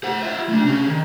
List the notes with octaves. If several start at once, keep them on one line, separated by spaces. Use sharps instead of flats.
C5 F#5
F4 E5
A3 D4
C3 C#4
D#3